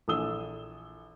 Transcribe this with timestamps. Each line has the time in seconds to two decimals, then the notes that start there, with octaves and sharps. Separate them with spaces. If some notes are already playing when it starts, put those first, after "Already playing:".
0.08 A#1 E3 A4 D#6 E6 G7